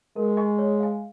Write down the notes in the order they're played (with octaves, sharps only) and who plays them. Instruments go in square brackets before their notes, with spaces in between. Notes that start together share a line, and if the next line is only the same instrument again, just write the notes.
[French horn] G#3 [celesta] A#4
[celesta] D#5 G#5 C#6
C#5
F5 G#5